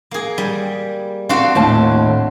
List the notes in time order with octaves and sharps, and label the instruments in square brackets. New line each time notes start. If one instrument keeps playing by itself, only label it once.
[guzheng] A#3 G#4
G3
[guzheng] C4 D4 F#4 [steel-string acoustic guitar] F5
[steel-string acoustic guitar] D#2 A2 A5